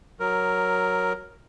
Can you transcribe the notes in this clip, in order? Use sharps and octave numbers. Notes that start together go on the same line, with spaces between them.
F#3 A#4